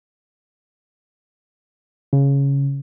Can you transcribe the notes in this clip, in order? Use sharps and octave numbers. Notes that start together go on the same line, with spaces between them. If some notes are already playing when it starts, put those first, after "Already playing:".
C#3